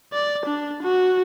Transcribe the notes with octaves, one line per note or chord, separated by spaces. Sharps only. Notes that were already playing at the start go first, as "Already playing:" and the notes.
D5
D4
F#4